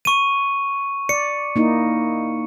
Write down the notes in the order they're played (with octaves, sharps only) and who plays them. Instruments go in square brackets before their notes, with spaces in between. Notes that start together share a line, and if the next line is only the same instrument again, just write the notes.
[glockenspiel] C#6 D#7
[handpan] D5 [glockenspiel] C#7
[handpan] A#3 D#4 E4